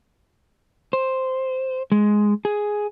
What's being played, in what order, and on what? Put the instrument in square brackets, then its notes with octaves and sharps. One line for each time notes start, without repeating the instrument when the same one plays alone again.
[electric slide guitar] C5
G#3
G#4